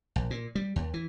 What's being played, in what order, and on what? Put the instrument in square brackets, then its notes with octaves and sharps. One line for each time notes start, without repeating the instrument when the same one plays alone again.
[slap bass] A#1
A#2
G3
D#2
E3